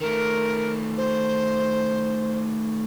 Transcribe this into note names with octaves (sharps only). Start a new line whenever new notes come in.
D#3 A3 A#4
C5